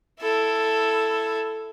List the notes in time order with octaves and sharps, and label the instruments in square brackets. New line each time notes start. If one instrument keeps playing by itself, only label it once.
[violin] E4 A4